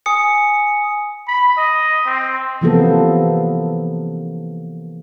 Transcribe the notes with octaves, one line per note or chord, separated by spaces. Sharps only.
G#5 D#6 C#7
B5
D#5
C4
C3 E3 F3 A#3 B3 A4